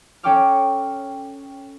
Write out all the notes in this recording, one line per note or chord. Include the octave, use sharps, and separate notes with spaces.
C#4 A4 G5 C#6 D6 F6